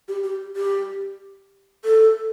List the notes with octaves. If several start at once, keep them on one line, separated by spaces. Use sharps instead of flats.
G4
G4
G4
A4